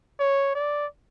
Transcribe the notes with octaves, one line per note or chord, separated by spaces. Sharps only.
C#5
D5